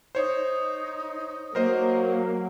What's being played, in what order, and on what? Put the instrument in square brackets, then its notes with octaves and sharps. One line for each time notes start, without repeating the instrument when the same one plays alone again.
[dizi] D#4 [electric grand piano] C5 C#5
[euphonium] F#3 [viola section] A#3 [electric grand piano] A#4 C5 D#5